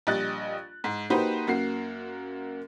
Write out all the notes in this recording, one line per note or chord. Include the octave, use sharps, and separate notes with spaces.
A#1 G3 D#5 F#6 A6
G#2
A#3 D#4 F#4 G4 B4 C5
F#2 A#3 F#4 C7